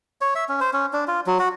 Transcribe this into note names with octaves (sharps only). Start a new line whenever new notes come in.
C#5
E5
C#4
C5
C#4
D4
F4
F#3
F#4